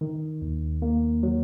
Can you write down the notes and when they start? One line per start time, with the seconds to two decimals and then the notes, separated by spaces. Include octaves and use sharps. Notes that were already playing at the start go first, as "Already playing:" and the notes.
0.01 D#3
0.42 D#2
0.82 A#3
1.23 F#3